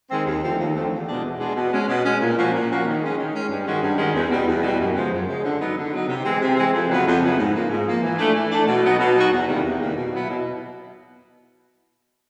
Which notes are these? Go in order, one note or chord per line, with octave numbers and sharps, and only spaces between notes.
D#3 G#3 C4
D#2
D3 F3 A3 C4
D#2
D3 F3 A3 C4
E2
B2 G#3 B3 D4
E2
B2 G#3 B3 D4
B2
G#3 C#4
B2
G#3 C#4
A#2
F3 A#3 C#4 F#4
A#2
F3 A#3 C#4 F#4
D#3
G#3 C#4
D#3
G#3 C#4
G2
D#3 G#3 C#4 F#4
G2
D#3 G#3 C#4 F#4
E2
B2 G3
E2
B2 G3
F#2
C#3 F3 G#3
F#2
C#3 F3 G#3
D3
F#3 B3 D#4
D3
F#3 B3 D#4
C3
E3 G#3 C4
C3
E3 G#3 C4
F2
C#3 F#3 B3 E4
F2
C#3 F#3 B3 E4
G#2
F3 A#3
G#2
F3 A#3
E3
A3 D4
E3
A3 D4
B2
F#3 B3 D#4 F#4
B2
F#3 B3 D#4 F#4
E2
C3 D#3 G3 A#3
E2
C3 D#3 G3 A#3
B2
F#3 B3 E4
B2